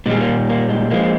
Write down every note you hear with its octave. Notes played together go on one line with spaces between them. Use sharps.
A#2 G3 G#3
A#3
A#3
G#3
F3 G#3 A#3